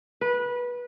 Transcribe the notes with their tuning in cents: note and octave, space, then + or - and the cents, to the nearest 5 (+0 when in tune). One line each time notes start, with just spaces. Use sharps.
B4 -20